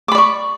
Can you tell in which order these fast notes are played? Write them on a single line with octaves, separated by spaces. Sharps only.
D6 B5 D5 C#6